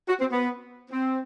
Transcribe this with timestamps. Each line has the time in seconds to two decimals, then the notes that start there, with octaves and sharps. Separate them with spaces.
0.08 F#4
0.20 C4
0.32 B3
0.91 C4